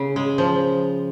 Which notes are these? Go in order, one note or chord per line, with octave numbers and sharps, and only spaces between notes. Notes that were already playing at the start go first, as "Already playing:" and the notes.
Already playing: C#3
G#3
F3